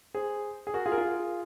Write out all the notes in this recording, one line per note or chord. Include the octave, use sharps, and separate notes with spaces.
G#4 C5
G#4
F#4 A#4
F4 G#4
A#4
F4 G#4